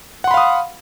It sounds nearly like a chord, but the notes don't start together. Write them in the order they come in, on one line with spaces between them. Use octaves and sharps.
F#5 C6 B5 F5 D#6